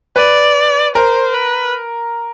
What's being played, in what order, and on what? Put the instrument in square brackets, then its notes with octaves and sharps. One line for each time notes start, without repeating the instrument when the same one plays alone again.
[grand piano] B4 [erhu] D5
[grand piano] A#4 [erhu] C5
[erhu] B4